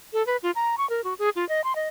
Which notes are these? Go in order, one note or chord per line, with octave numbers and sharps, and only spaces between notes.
A4
B4
F4
A#5
C#6
A#4
F#4
G#4
F4
D#5
C6
D#5